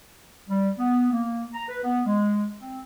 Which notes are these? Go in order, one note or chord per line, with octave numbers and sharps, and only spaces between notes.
G3
B3
A#3
A#5
B4
B3
G#3
C4